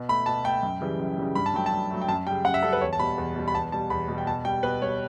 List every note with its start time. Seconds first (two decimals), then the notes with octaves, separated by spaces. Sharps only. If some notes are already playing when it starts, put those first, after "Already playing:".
Already playing: B2
0.09 A3 B5
0.26 B2 A5
0.44 A3 G5
0.63 F#2
0.81 C#3 E3 G3
0.99 F#2
1.17 C#3 E3 G3
1.35 G2 B5
1.46 A5
1.54 F#3 A3 G5
1.66 A5
1.72 G2
1.91 F#3 A3
2.02 G5
2.08 F#2 A5
2.27 C#3 G3 G5
2.45 F#2 F#5
2.54 E5
2.63 C#3 G3 A4
2.73 B4
2.81 E2 C#5
2.93 A5
2.99 B2 G3 B5
3.18 E2
3.36 B2 G3
3.48 B5
3.54 E2 A5
3.72 B2 G3 A5
3.90 E2 B5
4.08 B2 G3
4.18 G5
4.27 B2 A5
4.45 G3 G5
4.63 B2 B4
4.82 G3 C#5